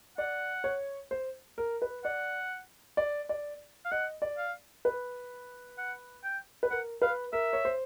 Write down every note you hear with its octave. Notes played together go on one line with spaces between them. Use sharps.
D5 F#5
C#5
C5
A#4
B4
D5 F#5
D5
D5
F5
D#5 F#5
D5
F5
B4
F#5
G5
B4
A#4 F#5
B4 F5
A#4 E5
C#5
C5